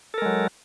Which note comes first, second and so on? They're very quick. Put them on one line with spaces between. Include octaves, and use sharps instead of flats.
A4 A#4 G#3 F#3